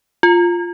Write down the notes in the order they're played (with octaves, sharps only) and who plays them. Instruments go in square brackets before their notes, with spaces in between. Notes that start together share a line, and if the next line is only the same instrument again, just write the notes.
[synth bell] F4